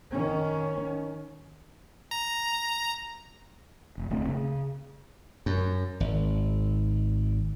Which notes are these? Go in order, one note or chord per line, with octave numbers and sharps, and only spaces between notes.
D#3 C#4
A#5
F1
D1 C#2 A3 C4
C#3
F#2
G#1